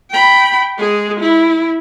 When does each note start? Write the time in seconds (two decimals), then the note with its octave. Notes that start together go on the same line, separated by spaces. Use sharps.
0.11 G5 B5
0.79 G#3 G#4
1.20 E4